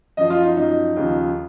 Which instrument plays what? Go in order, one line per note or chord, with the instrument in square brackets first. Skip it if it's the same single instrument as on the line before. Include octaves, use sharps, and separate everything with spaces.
[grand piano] F#2 F3 D#5
F4
D#4
F#2 F3 D#4
D#2 C#3 F3